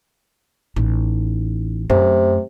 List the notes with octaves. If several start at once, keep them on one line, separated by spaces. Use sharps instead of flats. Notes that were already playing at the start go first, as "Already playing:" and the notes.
A1 D#4
F#2 C3 A3